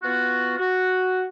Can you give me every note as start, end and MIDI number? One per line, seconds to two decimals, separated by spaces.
0.03 0.57 59
0.03 0.57 65
0.03 0.57 66
0.58 1.23 66